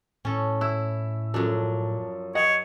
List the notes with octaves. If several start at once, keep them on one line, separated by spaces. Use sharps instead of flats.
A2 C#4 A4
E4 E6
F#2 F3 D4 A4
C#5 D#5 F#5